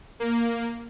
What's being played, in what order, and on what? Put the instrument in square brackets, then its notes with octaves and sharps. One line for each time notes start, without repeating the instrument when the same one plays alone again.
[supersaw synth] A#3